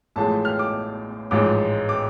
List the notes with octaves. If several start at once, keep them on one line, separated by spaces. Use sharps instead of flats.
A1 A2 F3 G#3 A5
F6
D6
A1 G#2 F3 G#3 D6
D6